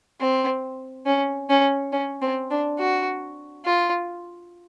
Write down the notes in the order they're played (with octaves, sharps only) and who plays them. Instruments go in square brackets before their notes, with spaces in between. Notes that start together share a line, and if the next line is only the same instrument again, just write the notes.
[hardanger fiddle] C4
C#4
C#4
C#4
C4
D4
F#4
F4